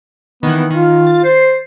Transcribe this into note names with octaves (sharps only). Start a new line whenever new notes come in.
D#3 E3 B3
B3
D#3 F4
A6
C5 C7